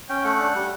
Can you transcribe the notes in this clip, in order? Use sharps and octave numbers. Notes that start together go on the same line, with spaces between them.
C#4 G5
A3 F#5
D4
G3